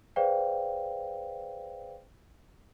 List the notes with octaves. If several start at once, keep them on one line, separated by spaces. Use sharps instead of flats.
G#4 B4 C5 D5 F5 G5